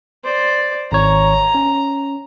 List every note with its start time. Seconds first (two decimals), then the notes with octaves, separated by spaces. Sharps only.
0.24 C5 D5
0.92 G#1 C#5 A#5
1.55 C#4